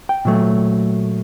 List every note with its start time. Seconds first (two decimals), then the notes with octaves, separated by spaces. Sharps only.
0.09 G5
0.25 A#2 F#3 A3